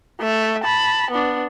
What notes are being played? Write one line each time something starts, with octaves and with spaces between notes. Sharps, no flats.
A3 E5
A5 B5
B3 D4